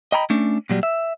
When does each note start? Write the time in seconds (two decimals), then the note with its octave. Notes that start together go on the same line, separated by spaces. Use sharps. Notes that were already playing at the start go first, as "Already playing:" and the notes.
0.12 D#5 G5 A#5 B5
0.30 A3 C#4 D4
0.70 A#2 F#3 G3
0.83 E5